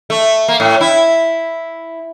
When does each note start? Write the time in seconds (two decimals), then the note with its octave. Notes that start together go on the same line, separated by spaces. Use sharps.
0.10 A3
0.48 A#3
0.60 A2
0.81 E4